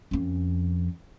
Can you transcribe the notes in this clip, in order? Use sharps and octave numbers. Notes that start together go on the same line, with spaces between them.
F2 C#4